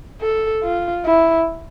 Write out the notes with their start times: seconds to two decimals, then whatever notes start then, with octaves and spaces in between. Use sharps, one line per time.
0.21 A4
0.63 F4
1.05 E4